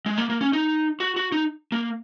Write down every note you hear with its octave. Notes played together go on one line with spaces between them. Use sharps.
G#3
A#3
A#3
C#4
D#4
F#4
F#4
D#4
A#3